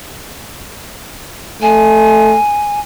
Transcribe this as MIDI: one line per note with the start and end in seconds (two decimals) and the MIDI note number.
1.62 2.37 57
1.62 2.80 80